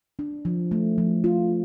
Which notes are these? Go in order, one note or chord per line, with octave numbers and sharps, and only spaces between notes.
D4
F3
A3
F3
F4